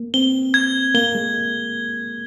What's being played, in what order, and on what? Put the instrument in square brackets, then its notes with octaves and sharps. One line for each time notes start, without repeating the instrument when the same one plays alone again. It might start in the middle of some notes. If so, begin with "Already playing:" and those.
Already playing: [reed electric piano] A#3
[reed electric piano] C4 [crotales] G7
[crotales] G#6
[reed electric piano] A#3 [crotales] G7
[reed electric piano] G#3